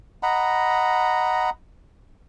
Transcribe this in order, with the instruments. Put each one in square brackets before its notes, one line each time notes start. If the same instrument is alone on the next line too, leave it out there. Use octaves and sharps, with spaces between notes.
[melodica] D#5 F#5 A#5 B5